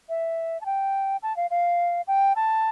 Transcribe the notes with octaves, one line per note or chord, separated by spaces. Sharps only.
E5
A5
G5
A5
F5
F5
G5
A5